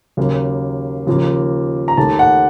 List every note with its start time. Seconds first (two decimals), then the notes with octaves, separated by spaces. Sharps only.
0.17 D#2 C#3 F#3 A#3
1.07 D#2 C#3 F3 A#3
1.88 A#5
1.97 D#2 D#3 A3 A5
2.19 F#5